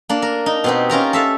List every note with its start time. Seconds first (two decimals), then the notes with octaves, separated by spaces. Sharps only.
0.09 A#3 D4
0.22 A#4
0.46 D#4
0.64 B2 C4 G4
0.90 C#4 F4 A#4 A#5
1.13 A4 E5 F5